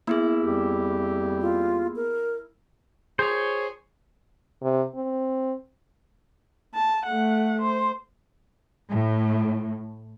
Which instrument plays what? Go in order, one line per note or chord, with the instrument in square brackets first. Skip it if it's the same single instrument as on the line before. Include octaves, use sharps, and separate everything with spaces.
[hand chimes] A#3 B3 G#4 [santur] E4
[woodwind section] F2 G3 G4
[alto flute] F4
A#4
[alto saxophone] G#4 [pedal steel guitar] C5 C#5
[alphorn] C3
C4
[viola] A5
A3 F#5
C5
[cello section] A2